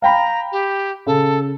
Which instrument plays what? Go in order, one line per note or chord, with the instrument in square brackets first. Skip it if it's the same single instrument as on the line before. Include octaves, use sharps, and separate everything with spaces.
[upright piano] F5 G5 B5 [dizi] A#5
[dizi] G4
[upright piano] C#3 [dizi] A4